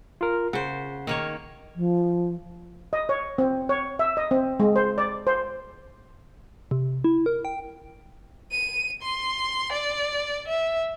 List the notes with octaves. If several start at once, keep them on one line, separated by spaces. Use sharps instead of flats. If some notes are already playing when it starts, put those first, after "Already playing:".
F4 A#4
C#3 C5 F#5
D#3 A#3 C#5
F3
D#5
C#5
C4
C#5
E5
D#5
C4
G#3
C5
D5
C5
C3
E4
A#4
G5
D#7
C6
D5
E5